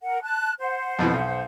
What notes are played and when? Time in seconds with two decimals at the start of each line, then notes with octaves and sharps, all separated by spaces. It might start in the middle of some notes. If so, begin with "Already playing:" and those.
0.03 A#4 F#5
0.22 A5 F#6
0.59 C5 F#5
0.99 F2 B2 E3
1.14 B1